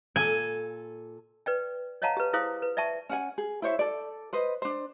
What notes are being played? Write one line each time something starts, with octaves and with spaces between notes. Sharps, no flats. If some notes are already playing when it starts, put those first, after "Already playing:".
A#2 A4 G#5
B4 D5 G5
C#5 D#5 F5 F#5 A5 A#5
G4 B4
E4 G#4 C5 F5 D#6
B4
D5 E5 G5 A5 C#6
C#4 F#5 G#5
G#4
E4 C5 C#5 E5
A4 D5
B4 C5 D#5
D4 C5